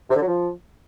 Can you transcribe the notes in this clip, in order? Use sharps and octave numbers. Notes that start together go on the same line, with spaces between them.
C3
D3
F#3
F3